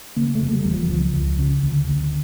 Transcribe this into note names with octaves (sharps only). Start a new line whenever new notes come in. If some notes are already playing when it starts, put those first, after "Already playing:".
C#3 A#3
A3
F1
G3
E2
F3
C#2 F3
C#2
C#3
D2
D2